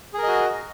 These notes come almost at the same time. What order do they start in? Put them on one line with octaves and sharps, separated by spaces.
G#4 A#4 D#5 F#4